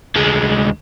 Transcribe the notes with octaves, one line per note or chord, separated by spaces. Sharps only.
D2 G#3